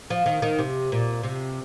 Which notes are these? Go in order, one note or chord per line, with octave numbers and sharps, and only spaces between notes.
F3
D#3
D#3
C3
A#2
C3